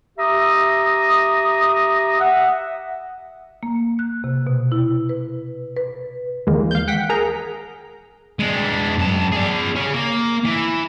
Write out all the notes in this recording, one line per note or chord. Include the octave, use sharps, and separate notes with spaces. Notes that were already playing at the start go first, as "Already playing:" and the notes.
G4 E5 A#5 D#6
E5 F#5
A#3
F#6
C3
B2
E4
B4
B4
D#2 D#3 E3 G#3 A#3
F5 G6
F#5 G5 B6
G#4 A#4 A#5
G#3 D4
F#2 A5
G#4 D5
C#4 G#4
A#3
E3